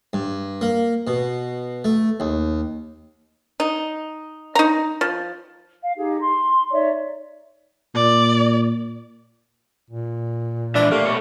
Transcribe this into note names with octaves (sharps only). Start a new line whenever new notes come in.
G2
A#3
B2
A3
D#2
D#4
D#4 A#5
F3
F5
D#4 G4 G#4
C6
D#4 C#5 D5 E5
A#2 D5
A#2
G#2 E3 D4 E5
A3 A#3 G4
B2 C#5